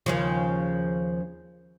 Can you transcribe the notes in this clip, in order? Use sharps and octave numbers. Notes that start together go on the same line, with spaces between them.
D#2 C#3 F3